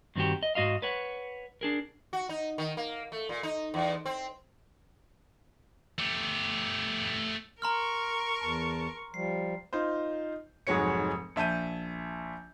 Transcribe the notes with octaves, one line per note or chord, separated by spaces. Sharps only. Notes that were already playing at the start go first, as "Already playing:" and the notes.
G2 D#3 C4 D4 F#4 G4
D#5
G#2 F#4 D#5 F5
B4 C#5 F#5
D4 G#4 A#4
F#4
D#4
D#3
A#3
A3
A#2
D#4
E2
C4
A3 G4
A#4 A#5 C6 C#6 F6
E2 A5
F3 G3 C7
D#4 F4 C5
F1 G#2 F#3 G#3 C#5 C#7
A#1 E5 A5 G6 D#7